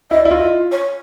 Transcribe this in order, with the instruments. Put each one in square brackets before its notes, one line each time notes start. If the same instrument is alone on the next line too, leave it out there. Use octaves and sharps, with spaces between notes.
[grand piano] E4 [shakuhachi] D#5
[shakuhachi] D5
[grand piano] E4
[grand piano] F4 [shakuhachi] D#5
[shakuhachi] C#5